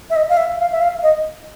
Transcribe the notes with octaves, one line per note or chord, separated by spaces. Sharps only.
E5
D#5
F5
E5
F5
E5
F5
D#5